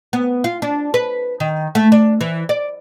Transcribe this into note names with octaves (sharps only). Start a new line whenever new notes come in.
B3
F4
D4
B4
D#3
A3
D4
E3
D5